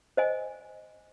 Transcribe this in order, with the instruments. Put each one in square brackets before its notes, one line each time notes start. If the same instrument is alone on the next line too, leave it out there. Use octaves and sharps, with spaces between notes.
[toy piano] C5 D#5 G#5